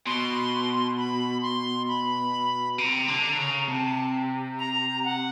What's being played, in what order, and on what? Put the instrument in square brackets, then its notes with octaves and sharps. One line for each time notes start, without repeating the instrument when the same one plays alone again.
[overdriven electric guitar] B2 [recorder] C6
[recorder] B5
C6
B5
[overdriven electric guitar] C3 [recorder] B5
[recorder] A#5
[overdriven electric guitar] D3
C#3
[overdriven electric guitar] C3 [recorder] A5
[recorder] A#5
F#5